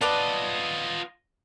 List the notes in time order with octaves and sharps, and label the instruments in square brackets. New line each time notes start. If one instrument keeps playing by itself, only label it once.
[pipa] B3 D5 A5 [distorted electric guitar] F4 D#5